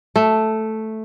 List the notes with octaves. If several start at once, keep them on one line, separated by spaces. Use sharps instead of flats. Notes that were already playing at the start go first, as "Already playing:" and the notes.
A3